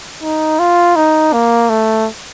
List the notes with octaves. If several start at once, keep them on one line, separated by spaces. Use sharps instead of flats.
D#4
F4
D#4
A#3
A3